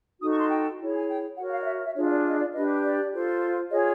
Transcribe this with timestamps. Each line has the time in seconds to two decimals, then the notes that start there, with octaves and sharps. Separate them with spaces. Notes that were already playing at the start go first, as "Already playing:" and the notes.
0.20 D#4 F#4 A4 D#6
0.31 C#6
0.40 C6
0.49 G5
0.79 E4 G#4 C#5
0.96 G#5
1.09 G5
1.37 F#4 A#4 C#5 F#5
1.47 F#5
1.51 F5
1.61 D#5
1.66 E5
1.86 E5
1.95 D4 F4 G#4 C#5
2.05 D#5
2.10 D5
2.28 D#5
2.39 D5
2.53 D4 G4 B4 D#5
2.82 D5
3.12 F4 A4 C5
3.70 F4 G#4 C#5 D#5